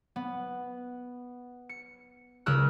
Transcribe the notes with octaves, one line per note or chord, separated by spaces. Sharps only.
B3
C#7
C#2 C#3 A#4 D#6 E6 F#6